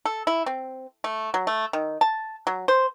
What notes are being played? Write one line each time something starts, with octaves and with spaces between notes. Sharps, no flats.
A4
E4
C4
A3
F#3
A3
D#3
A5
F#3
C5